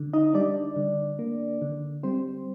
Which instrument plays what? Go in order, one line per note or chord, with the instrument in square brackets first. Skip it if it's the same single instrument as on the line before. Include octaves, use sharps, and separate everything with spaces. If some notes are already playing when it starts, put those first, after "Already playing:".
Already playing: [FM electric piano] D3
D#4 D#5
G3 D4 D5
D3
A#3
D3
G3 C4 C5